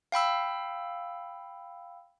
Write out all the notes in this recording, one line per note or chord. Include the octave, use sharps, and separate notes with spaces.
F5 G5 B5 E6